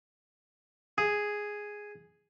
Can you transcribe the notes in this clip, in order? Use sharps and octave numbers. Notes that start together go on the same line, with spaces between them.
G#4